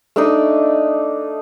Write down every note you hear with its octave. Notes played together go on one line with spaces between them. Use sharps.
A3 D4 D#4